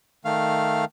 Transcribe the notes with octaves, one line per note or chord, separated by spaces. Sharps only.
D#3 A3 F5